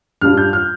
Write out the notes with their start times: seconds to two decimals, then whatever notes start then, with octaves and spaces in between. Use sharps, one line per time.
0.21 G2 G3 D4 F4 F6
0.37 G6
0.53 F6